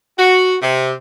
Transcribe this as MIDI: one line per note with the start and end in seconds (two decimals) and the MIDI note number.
0.19 0.56 66
0.62 0.93 48